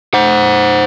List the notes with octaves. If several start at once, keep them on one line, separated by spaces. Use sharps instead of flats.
C5 F#5